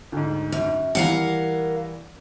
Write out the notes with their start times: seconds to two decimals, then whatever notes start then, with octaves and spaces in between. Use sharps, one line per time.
0.12 D2 G#2
0.52 F#2
0.95 E3 G3 A#4 F5 F#5